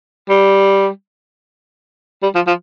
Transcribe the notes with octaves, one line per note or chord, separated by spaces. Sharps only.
G3
G3
F3
F3